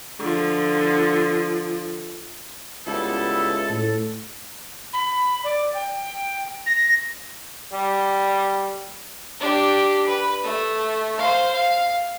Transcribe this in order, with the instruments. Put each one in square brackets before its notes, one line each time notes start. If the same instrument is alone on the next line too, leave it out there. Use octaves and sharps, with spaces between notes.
[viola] D3 F3
[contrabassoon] C#2 [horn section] G3 B3 E4 [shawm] A4
[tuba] A2
[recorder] B5
D5
G5
A#6
[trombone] G3
[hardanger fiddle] D4 G4
B4
A3
C5 F5
F5